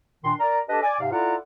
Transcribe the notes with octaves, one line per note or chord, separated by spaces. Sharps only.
A#2 D#3 D4 C6
A#4 D5 A#5
D4 G4 A4 B4 D#5 A5
D5 G#5
G#2 C3 F5
E4 F4 A4 D5 F#5 A#5